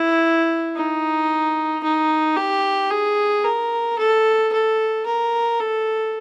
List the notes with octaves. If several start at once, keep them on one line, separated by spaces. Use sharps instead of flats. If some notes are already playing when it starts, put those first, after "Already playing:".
Already playing: E4
D#4
D#4
G4
G#4
A#4
A4
A4
A#4
A4